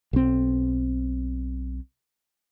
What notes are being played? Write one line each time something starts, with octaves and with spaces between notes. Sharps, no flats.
B1 C4